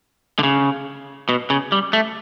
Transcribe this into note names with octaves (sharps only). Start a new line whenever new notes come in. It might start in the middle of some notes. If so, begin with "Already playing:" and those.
D3
C#3
B2
C#3
G3
A3